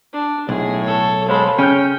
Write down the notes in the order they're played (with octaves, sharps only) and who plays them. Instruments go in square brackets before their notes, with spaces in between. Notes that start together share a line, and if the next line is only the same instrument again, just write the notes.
[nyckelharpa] D4
[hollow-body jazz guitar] B1 [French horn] A2 [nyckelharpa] G#4
[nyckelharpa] A4 C#5
[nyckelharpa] G#3 A4 [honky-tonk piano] C5 F5 B5 [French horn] C#5
[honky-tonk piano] C#3 F6 G6 [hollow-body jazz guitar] C#4 [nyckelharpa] G5